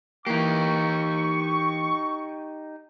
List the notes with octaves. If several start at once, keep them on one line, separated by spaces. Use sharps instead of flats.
E3 A#3 D#4 G4 C#6